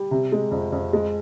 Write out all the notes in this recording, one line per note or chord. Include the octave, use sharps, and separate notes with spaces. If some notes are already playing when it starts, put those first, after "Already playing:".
Already playing: G3
C3
G#3
F2
F2
G#3